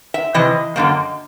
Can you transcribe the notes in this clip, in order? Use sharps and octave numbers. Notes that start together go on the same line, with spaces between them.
E5
C3 E3 D#5
F#2 D3 F3 A#3